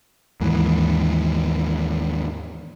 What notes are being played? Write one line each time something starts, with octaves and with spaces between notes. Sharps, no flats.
D#2 G#2 E3